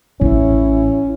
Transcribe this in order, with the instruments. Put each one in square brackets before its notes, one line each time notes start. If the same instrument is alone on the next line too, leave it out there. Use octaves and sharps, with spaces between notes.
[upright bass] A1 A2 [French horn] C#4 [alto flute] E4